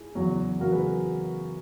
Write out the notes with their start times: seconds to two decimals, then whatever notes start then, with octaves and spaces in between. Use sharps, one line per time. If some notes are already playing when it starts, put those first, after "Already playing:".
Already playing: E4 G#4
0.15 E2 C#3 F#3
0.60 E2 C#3 F#3 F#4 A#4
0.72 G#4 B4